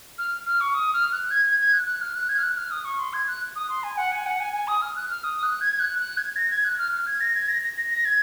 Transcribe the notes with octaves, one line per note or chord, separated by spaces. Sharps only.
F6
F6
C#6
D#6
F6
F#6
G#6
G#6
G#6
F#6
F#6
F6
F#6
G#6
F6
F#6
F6
D#6
C#6
C6
G#6
F#6
D#6
C6
G#5
F#5
G#5
F#5
G#5
G#5
D#6
F6
F#6
F6
D#6
F#6
G#6
F#6
F#6
G#6
A#6
G#6
F#6
F6
F6
G#6
A#6
G#6
A#6
A#6
A#6
G#6